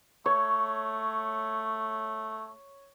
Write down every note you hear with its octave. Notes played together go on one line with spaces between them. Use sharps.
A3 C#5